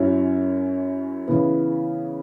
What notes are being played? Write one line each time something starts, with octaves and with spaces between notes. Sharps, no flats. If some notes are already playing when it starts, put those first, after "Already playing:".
Already playing: F#2 F#3 C#4 E4
C#3 E3 B3 E4